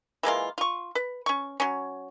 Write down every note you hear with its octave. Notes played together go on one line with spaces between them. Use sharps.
E3 G#3 A#3 F4
F4 C#6
B4
C#4 C#6
F#3 C#4